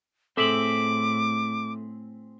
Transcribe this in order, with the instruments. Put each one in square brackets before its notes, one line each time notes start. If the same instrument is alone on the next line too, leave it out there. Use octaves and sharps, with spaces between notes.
[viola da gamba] A2 [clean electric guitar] C4 G#4 E5 [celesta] A4 F#7 [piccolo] D6